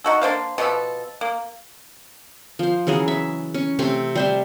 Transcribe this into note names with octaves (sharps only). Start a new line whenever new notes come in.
D#4 F#4 A4
A#3 D4 C5 F5
B2 F3 B3 A4
A#3
F3 C5
C#3 E3 F#3 G#4
E5
C#4
C3 A3 C4
G3 C5 E5